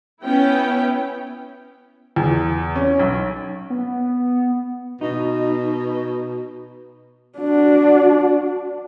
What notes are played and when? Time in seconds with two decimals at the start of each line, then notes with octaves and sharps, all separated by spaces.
0.24 B3 C#4 E4 G5
2.16 E2
2.75 C#4
2.99 B1
3.70 B3
5.01 B2 D#4
7.39 D4 F#4